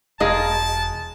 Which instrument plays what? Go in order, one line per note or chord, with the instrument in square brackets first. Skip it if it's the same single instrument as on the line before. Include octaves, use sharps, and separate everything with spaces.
[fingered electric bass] E1 [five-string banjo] G#3 D#5 F5 [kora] G#4 A#4 [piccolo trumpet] A5